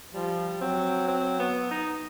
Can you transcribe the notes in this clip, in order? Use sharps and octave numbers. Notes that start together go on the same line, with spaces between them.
F3 G3
F#3 C4
C4
B3
D#4